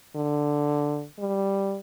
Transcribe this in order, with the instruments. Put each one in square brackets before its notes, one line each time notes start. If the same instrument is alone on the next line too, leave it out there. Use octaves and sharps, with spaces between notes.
[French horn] D3
G3